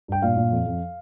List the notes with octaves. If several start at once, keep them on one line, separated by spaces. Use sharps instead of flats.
G2 G5
A#2 F5
A#2
F2
F2